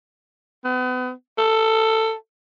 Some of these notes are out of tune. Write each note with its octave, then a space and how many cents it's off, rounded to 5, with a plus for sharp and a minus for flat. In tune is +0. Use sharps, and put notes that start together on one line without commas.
B3 +35
A4 +15